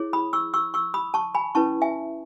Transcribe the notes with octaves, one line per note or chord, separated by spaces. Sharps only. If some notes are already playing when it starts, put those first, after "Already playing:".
Already playing: E4 G#4 C#5
B5 D#6
C#6 E6
C#6 E6
C#6 E6
B5 D#6
A5 C#6
G#5 B5
C#4 E4 B4 A5 C#6
E5 G#5